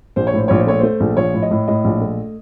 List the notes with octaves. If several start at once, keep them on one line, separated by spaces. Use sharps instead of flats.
A#1 C5
C#5
A2 C5
A#1 C#5
C5
A3 C#5
A3 C5
A#1
F3 C#5
A2
D#5
A2
A2 D#5
A#1
A3